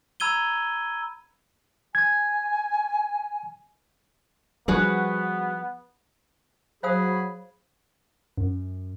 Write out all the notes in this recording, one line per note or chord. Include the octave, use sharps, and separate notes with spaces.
A#5 B5 E6 G#6 D#7 G7
G#5 G#6
F3 G3 B3 F#4 G#4 B4
F#3 G#4 C5 F5 B5 D#6
F#2